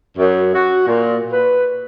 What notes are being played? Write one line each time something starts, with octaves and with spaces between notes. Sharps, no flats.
F#2
F#4
A#2
B4